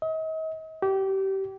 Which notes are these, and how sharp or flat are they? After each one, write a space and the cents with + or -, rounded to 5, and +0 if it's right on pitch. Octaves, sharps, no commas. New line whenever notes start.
D#5 +40
G4 -25